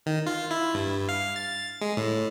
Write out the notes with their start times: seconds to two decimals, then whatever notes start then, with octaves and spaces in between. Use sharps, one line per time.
0.06 D#3
0.27 F4
0.51 E4
0.74 G2
1.09 F5
1.36 A6
1.81 G#3
1.97 A2